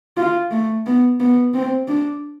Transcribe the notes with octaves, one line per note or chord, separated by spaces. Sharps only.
F4
A3
B3
B3
C4
D4